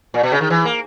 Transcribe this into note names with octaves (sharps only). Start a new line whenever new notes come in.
A#2
B2
C#3
D#3
E3
A#3